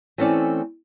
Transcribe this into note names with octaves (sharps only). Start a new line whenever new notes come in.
E3 A3 C4 C#4 A4 D5